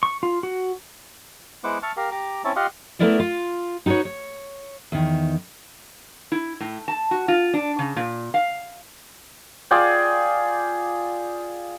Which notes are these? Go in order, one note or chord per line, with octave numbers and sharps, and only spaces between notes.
C#6
F4
F#4
G#3 B3 E4 C5 F#5 D6
E5 A5 C#6 F6
G4 A#4 F5
G4 A#5 D6
C4 C#4 E4 C#5 E5 A5
F4 G4 D#5 F5 F#5 C6
A3 B3 E4 A#4 D5 E5
F4
D#4 F#4 A4 B4 C#5
C#5
E2 D#3
E4
A2
A5
F#4
F4
D4
C#3
A#2
F5
F4 G#4 D5 G5